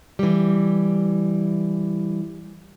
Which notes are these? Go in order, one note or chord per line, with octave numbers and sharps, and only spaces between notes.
E3 G3